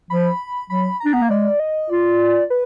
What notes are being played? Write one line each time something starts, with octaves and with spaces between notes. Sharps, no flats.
F3 B5
F#3 B5
D4 A#5
B3
A#3
G#3 D5
D#5
F4 D5
B4